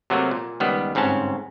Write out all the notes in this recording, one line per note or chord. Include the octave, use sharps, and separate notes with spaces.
C3 F#3 A3 A#3
A#2
C#2 D#3 G3 B3
G1 G#2 C4 C#4 A5